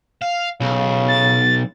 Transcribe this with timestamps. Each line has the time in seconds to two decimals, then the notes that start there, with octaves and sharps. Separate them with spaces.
0.22 F5
0.61 B1 C#3
1.08 A6